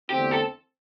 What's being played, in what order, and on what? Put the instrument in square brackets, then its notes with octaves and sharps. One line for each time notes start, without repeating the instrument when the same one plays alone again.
[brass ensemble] E2 D3 A3 C4 [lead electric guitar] G4
[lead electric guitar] A4